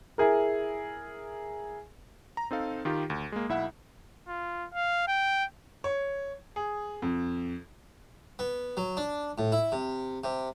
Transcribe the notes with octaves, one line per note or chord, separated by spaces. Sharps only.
E4 G#4 A#4
A#5
C4 D#4 A4 F5
D#3 D#4 F4 G4
D2
G#3 A#3
B1 E4 E5 F#5
F4
F5
G5
C#5
G#4
F2
B3
F#3
D4
A2
E4
C3
C3